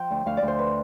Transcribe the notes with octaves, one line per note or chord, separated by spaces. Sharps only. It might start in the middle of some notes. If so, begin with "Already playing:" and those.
Already playing: F3 G5
D2
D2 F5
D5
D2
C5
B4